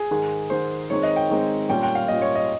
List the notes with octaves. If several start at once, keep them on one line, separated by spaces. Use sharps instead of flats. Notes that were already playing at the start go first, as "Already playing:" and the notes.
Already playing: G#4
G#2 D#3 G#3
G#2 D#3 G#3 C5
D#3 G#3 C4 D#4 C#5
D#5
G5
D#3 G#3 C4 D#4
A#2 G3 C#4 F4 G5
G5
F5
A#2 G3 C#4 F4 D#5
C#5
D#5